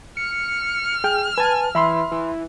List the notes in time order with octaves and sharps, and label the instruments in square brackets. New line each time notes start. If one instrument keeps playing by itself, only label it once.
[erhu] F6 [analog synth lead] C#7
[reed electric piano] G#4 G5
[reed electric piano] B4 A5 [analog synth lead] G#5
[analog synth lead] E3 [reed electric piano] E5 B5 C6
[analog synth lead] E3